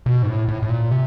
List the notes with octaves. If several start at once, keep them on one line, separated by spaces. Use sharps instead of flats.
B2
G#2
A2
A2
A2
A#2
C3